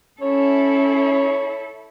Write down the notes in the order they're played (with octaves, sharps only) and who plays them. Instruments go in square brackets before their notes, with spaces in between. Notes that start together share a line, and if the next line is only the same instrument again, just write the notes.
[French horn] C#4 [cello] E4 A4 [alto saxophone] C#5